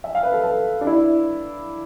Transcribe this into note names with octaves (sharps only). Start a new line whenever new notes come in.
E5
F5
B4
A4
A4
D4
E4